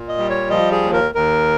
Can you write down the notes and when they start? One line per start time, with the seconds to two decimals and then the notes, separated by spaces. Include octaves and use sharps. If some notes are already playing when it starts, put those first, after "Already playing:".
Already playing: A#2
0.08 D#5
0.18 G3
0.30 C#5
0.50 F3 D#5
0.72 G#4
0.83 D#2
0.93 A#4
1.15 D#2 A#4